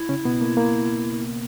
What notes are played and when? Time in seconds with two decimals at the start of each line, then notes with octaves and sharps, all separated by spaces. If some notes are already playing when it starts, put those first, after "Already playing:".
Already playing: E4
0.09 C#3 C#4
0.25 B2 B3
0.41 A#3
0.57 A#3